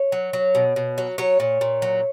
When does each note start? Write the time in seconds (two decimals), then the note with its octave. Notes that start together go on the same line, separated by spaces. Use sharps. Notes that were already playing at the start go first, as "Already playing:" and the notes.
Already playing: C#5
0.12 F#3
0.33 F#3
0.55 B2
0.76 B2
0.98 F#3
1.18 F#3 C#5
1.40 A#2
1.61 A#2
1.82 F#3